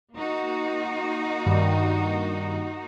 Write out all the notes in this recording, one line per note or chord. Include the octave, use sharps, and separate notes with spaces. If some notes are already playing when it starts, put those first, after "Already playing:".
A#3 D#4 F#4
G2 D#3 G3